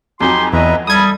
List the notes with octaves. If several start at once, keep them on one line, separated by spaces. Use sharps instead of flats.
F2 F#3 D#4 G4 G#5 C6
E2 B4 D#5 E5 A#5
G3 E4 A4 D#6 G#6